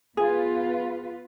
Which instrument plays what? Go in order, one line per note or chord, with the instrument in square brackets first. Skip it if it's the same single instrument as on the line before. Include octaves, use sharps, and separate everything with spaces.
[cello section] B3 F4 B4 [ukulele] G#4